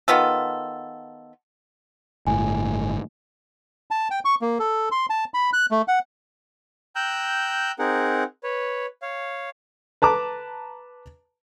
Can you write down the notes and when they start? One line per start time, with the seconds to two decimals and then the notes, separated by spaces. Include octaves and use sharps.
0.08 D#3 B3 F4 A4
2.27 G1 A2 G#5
3.91 A5
4.11 G5
4.25 C#6
4.42 A#3
4.59 A4
4.91 C6
5.10 A5
5.34 B5
5.53 F#6
5.71 A3
5.88 F#5
6.96 G5 A#5 E6 F#6 G6
7.79 C4 D#4 G#4 A#4 F#5
8.43 B4 C#5
9.02 C#5 F5
10.02 B4 A5 A#5 D6